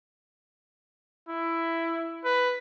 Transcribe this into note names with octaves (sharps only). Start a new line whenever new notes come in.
E4
B4